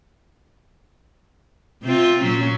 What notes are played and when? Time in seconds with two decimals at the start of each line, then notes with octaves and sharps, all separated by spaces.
1.83 C3 C4 F4
2.22 A#2 F#3 C#4